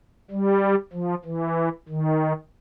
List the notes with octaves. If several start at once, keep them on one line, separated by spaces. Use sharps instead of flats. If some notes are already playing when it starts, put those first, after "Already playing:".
G3
F3
E3
D#3